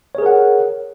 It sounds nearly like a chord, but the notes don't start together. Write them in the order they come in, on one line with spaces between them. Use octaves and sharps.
C#5 G#4 A#4 F#5